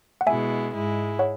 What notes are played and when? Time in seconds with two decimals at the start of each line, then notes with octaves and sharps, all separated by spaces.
0.21 F#5
0.27 B2 G#3 E4 E5 G#5
0.73 G#2 G#3 E4
1.19 C#5 F#5